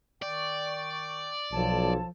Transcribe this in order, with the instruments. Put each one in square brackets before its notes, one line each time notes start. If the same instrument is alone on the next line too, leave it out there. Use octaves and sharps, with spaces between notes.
[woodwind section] D#3 G5 C#6 [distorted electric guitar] D5
[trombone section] B1 [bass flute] F3 [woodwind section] A4 C#5 A5